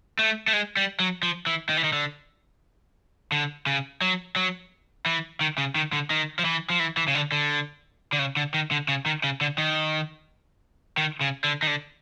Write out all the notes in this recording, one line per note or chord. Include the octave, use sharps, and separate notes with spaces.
A3
A3
G#3
G3
F#3
F3
E3
D#3
E3
D#3
D3
D3
C#3
F#3
F#3
E3
D#3
C#3
D#3
D3
D#3
F3
E3
F3
E3
E3
C#3
D3
D3
D3
C#3
D3
D#3
D3
C#3
D#3
C#3
D3
D#3
D#3
C#3
D3
D#3
D3